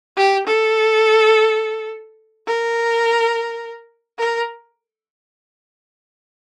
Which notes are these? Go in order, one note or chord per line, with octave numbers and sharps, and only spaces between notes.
G4
A4
A#4
A#4